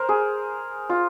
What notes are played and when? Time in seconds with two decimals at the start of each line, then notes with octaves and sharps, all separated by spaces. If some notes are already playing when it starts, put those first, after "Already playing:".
Already playing: A#4 C5
0.09 G#4
0.89 F4